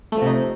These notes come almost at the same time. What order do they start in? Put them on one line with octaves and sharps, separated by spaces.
A3 F3 C3 D#4